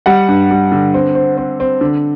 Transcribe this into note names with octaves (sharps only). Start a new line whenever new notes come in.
G3 F#5
G2
G3
D3
C4
C4
C4
C4
D3